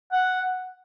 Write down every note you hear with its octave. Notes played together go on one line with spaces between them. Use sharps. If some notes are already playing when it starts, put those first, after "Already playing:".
F#5